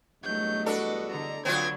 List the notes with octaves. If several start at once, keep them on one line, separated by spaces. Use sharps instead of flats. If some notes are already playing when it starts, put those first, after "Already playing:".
E2 G2 F#3 A3 D#5 G6
D4 F#4 A4 B4
D3 A#5
D3 F#3 B3 C4 F4 G#6